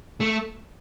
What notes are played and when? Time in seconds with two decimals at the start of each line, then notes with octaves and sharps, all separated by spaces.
0.21 A3